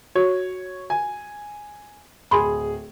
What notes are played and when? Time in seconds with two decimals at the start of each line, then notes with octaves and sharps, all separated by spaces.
0.16 F#4 C#5
0.90 G#5
2.31 D1 G#4 B5 C6